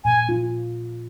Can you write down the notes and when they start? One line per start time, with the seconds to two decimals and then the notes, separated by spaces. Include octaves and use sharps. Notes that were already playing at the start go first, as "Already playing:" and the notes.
0.04 A#2 G#5
0.29 F4